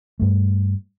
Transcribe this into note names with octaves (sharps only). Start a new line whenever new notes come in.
G2 A3